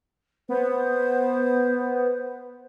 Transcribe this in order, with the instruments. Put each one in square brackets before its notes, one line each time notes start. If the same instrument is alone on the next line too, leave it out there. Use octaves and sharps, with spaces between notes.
[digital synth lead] B3 [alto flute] C5